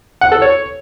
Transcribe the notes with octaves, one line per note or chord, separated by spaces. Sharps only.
F#5
A4
C#5